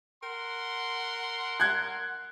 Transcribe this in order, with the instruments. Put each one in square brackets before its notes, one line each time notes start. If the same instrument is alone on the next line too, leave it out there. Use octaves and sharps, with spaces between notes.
[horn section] A#4 F#5 C6
[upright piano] F#6 G#6